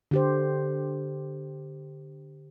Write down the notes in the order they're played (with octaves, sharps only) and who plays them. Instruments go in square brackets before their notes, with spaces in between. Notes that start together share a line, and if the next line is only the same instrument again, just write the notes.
[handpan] D3 G4 C5